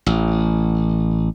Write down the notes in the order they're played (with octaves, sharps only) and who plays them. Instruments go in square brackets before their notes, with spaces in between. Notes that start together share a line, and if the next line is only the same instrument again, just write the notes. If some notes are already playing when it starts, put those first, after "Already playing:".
[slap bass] A1